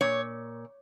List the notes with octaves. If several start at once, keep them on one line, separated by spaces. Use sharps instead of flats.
A#2 C#5